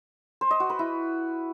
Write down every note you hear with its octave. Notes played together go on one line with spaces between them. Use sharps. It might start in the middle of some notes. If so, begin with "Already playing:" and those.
C5
D#5
F#4
B4
E4